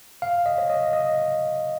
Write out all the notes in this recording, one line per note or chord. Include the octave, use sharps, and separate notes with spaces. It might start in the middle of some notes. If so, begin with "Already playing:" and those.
F5
D#5
C#5
D#5
D#5